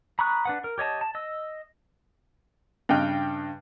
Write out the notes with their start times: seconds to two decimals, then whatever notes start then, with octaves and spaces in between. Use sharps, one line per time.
0.19 A#5 B5 C#6 D#6 F#6
0.45 D4 B4 F#5
0.64 A#4
0.78 G4 C#5 D#5 A5
1.01 A5
1.15 D#5 E6
2.89 G2 C#3 D#5 G5 F6 F#6